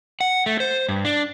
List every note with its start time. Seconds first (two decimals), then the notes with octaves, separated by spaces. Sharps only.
0.21 F#5
0.46 A3
0.60 C5
0.89 G2
1.05 D4